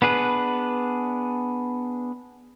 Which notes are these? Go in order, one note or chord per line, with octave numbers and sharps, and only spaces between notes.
B3 D4 G#4 B4